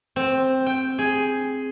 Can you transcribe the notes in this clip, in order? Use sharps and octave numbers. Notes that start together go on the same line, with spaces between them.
C4
G5
G#4